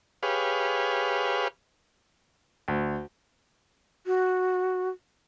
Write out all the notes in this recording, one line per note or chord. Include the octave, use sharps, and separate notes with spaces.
G4 G#4 B4 C#5 F5
D2
F#4